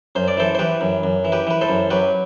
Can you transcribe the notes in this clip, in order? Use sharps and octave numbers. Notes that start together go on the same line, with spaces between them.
F#2 C5
D5
E3 A4 C5
C5
E3 G4 B4
F#2
F#2
E3
G4 B4
E3 B4
A4 C5
F#2
F#3 G4 B4